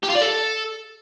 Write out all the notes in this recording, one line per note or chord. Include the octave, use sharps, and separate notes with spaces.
G4
F4
D5
A4